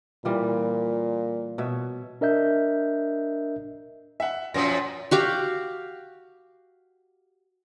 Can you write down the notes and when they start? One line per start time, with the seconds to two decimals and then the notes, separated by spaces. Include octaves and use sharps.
0.25 A#2 E3 G3 F4
1.58 B2 C#5 E5
2.21 D4 A#4 D#5 E5 G6
4.20 E5 F#5
4.54 F#2 A#2 F3 A#6
5.11 F#4 G4 F5